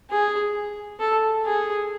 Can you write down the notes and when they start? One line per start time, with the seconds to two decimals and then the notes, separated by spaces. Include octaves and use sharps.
0.10 G#4
1.00 A4
1.45 G#4